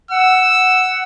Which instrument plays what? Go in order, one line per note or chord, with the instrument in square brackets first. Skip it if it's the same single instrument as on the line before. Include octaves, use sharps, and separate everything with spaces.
[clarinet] F#5 [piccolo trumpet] E6